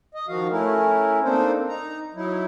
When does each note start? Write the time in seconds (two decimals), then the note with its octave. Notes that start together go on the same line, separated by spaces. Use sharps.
0.15 D#5
0.28 D#3 F3 F#4 F5
0.51 A3 C#4 E4 A#4
1.24 A#3 C4 D4 D#4 A4 C5
1.68 D#4 A#5
2.15 F#3 D#4 E4